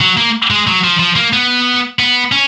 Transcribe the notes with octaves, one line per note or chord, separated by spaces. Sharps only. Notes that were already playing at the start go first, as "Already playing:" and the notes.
F#3
A#3
G#3
F#3
F3
F3
A#3
B3
B3
C#4